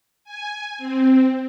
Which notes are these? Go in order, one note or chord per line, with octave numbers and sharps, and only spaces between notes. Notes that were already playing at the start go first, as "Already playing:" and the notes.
G#5
C4